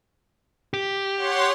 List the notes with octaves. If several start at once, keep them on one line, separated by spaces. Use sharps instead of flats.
G4
C#5 F#5 C6